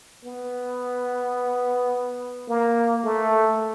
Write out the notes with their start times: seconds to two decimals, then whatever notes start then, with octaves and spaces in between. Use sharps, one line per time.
0.25 B3
2.48 A#3
3.04 A3